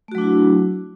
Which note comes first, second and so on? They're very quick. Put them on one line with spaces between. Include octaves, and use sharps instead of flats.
A3 F#4 F#3 D4 E4